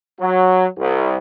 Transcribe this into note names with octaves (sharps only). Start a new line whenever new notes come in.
F#3
C2